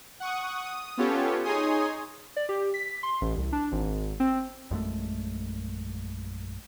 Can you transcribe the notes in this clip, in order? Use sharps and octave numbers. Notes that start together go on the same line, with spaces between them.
F#5 C#6 D#6
D#6
B3 C#4 F4 G4 A4 C#5
D#4 G#4 C#5 G#5 C6 D#6
D5
G4
B6
C6
A1
C2
D4
G#1
C4
A#1 F#2 G#3 A3